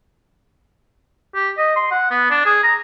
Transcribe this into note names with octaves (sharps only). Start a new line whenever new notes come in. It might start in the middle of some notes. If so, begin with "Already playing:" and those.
G4
D#5
C6
F#5
B3
D4
G#4
A#5